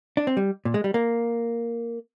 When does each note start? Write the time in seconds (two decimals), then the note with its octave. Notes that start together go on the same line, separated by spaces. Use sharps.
0.17 D4
0.27 C4
0.37 G3
0.65 A#2
0.74 G#3
0.84 G3
0.94 A#3